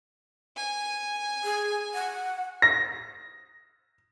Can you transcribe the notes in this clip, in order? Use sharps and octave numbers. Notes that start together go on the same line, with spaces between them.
G#5
G#4
F#5
A#6